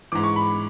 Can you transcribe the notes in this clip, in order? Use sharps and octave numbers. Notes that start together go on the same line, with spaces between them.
G#2 E3 D6
C#6
B5